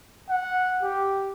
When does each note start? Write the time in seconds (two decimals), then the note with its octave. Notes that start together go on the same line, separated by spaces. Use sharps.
0.29 F#5
0.83 G4